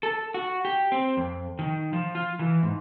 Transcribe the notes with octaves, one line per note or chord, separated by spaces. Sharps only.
A4
F#4
G4
C4
F2
D#3
F3
F4
E3
G#2